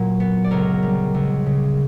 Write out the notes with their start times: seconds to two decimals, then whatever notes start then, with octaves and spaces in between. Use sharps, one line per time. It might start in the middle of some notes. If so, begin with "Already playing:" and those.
Already playing: A#2 F#3
0.20 B3
0.44 D5
0.51 C#2 A#4 C#5
0.83 G3
1.15 C#2
1.46 C#3